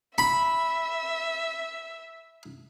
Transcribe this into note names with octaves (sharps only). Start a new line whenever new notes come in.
E5 B5